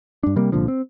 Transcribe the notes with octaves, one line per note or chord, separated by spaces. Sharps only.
G2 D4
C3 G3 A#3
C2 A#2 D3 F3
C4